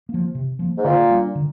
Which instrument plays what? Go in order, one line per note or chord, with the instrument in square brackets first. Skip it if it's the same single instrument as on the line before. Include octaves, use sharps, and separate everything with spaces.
[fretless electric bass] F3 A#3
C3
F3 A#3
[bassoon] G#2
[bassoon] A#2 [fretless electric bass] D3
[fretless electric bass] G3 D4
D3